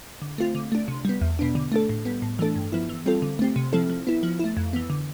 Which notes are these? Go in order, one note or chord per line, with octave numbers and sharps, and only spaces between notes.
D3
A3 C4 F4
D3
A3 D4
C3
G3 B3
E2
B2 B3 D4
D3
A3 D4 A4
A2
G3 B3
A2
E3 A3 D4 A4
G2
F3 B3 E4
E3
G3 C4 F4 A4
D3
A3 C4 G4
C3
F3 C4 E4 A4
F3
B3 E4
F3
A3 E4
F2
E3 B3
D3